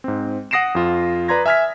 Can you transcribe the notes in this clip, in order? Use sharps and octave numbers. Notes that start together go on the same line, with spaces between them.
G#2 C4
F#5 D#6 A#6 C7 D7 E7
F2 F4
B4 D5 A#5 C6 G#6 A#6
E5 G#5 F6 G#6 B6